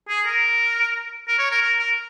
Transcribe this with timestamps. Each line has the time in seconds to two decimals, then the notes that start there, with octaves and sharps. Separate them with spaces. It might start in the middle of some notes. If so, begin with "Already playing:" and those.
0.09 G#4
0.26 A#4
1.28 A#4
1.39 C#5
1.51 A#4
1.62 A#4
1.80 A#4